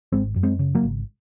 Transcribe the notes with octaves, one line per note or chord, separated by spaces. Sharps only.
G#1 G#3 C4
F#2
G#3 C4
C#3
F#3 A#3
G#1